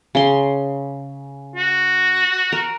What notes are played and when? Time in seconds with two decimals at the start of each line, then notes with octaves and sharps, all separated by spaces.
0.15 C#3 C6
1.56 F#4
2.52 A#4